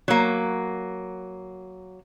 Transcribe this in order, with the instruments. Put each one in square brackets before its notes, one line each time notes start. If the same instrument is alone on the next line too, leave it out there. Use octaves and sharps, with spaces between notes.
[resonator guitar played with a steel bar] F#3 A#3